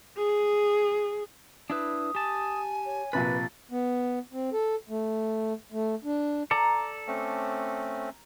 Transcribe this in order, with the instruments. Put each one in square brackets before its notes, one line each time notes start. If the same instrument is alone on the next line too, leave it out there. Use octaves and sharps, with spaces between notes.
[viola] G#4
[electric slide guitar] D4 E4 B4 [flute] D#6
[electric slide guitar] G4 A5 [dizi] G#5
[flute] C#5
[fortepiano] A#1 C3 B5 [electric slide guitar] B4 [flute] A6
[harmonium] B3
C4
A4
A3
A3
D4
[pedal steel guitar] A4 D5 [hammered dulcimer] A#5
[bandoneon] A3 C4 C#4